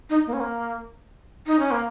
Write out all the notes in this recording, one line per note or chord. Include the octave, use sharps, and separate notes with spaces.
D#4
A#3
C#4
A#3
D#4
C#4
A#3